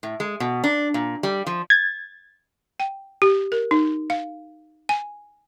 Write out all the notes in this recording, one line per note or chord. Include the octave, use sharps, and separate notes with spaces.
A2
G#3
B2
D4
A#2
G3
F3
G#6 A6
G5
G4
A#4
D#4
F5
G#5